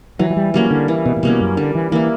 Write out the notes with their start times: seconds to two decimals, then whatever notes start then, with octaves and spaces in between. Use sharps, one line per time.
0.19 E3 F#3
0.30 F#3
0.37 G3
0.54 F#3 G3 A#3 C#4
0.71 D3
0.88 E3
1.05 B2
1.16 A#2
1.23 B2 G3 A#3 C#4
1.40 F#2
1.57 D3 G3
1.75 E3
1.91 E3 A#3 E4